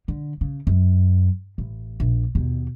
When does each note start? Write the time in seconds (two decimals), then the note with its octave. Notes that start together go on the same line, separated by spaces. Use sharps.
0.08 D3
0.41 C#3
0.67 F#2
1.58 A1
2.00 A#1
2.35 D#2 B2